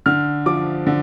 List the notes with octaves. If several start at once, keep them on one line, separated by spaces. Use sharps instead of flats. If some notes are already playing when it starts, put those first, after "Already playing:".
D3 F6
F3 D6
D3